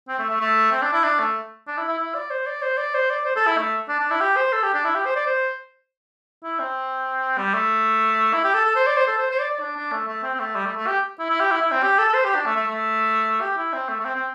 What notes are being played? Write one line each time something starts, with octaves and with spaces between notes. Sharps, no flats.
C4
A3
A3
A3
C4
D4
E4
D4
A3
D4
E4
E4
E4
D5
C5
D5
C5
D5
C5
D5
C5
A4
E4
A3
D4
D4
E4
G4
C5
A4
G4
D4
E4
G4
C5
D5
C5
E4
C4
G3
A3
E4
G4
A4
A4
C5
D5
C5
A4
C5
C5
D5
D5
D4
D4
A3
A3
C4
C4
A3
G3
A3
A3
G4
E4
E4
G4
E4
E4
C4
G4
A4
A4
C5
G4
D4
A3
A3
A3
G4
E4
C4
A3
A3
C4
C4